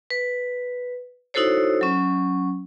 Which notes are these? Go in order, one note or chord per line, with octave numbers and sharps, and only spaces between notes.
B4
D#4 E4 F#4 A4 C5 C#5
F#3 C#4